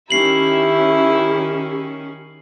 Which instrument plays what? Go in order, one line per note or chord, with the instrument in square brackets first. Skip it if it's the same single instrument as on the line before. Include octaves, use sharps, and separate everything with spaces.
[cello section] D#3 C#4 [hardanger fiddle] E4 E5 [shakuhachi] G4 [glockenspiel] C7 F#7